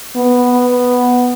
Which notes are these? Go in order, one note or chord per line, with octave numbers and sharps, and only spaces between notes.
B3